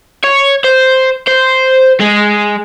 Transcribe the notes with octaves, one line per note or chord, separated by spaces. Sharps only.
C#5
C5
C5
G#3